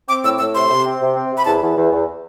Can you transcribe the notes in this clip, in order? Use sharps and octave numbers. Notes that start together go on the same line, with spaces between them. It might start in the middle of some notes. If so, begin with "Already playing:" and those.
C4 D6
A2 E6
A2 E6
C3 C6
C3
C4
C3
C4
C3
B5
E2 A5
E2
E2
E2